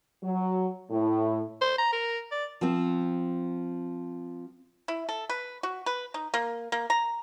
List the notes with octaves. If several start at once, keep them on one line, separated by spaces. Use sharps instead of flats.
F#3
A2
C5
A#5
A#4
D5
F3 C4
E4
A4
B4
F#4
B4
D#4
A#3
A#3
A#5